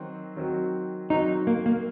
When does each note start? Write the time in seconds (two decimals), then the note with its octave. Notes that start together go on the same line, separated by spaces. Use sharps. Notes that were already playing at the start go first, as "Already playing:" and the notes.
Already playing: D#3 F#3 C4 F#4
0.36 D#3 F#3 C4 F#4
1.10 D#3 F#3 C4 D#4 F#4
1.47 A#3
1.66 A#3